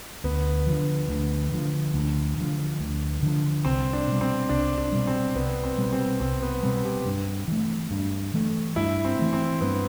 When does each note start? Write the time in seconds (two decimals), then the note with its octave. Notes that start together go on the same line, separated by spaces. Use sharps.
0.24 D2 B3
0.67 D3 F3
1.09 D2
1.52 D3 F3
1.94 D2
2.37 D3 F3
2.80 D2
3.23 D3 F3
3.65 C2 C4
3.93 D4
4.08 B2 G3
4.21 C4
4.49 C2 D4
4.78 D4
4.92 B2 G3
5.07 C4
5.35 C2 B3
5.64 C4
5.78 B2 G3
5.93 C4
6.20 C2 C4
6.42 B3
6.62 B2 G3 C4
6.85 G4
7.06 G2
7.48 E3 A3
7.91 G2
8.34 E3 A3
8.76 G2 E4
9.05 C4
9.19 E3 A3
9.33 C4
9.61 G2 B3